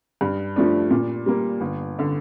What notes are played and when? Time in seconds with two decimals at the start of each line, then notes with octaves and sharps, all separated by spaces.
0.21 G2
0.56 F3 A3 D4
0.91 A#2
1.26 G3 A#3
1.60 G1
1.99 D3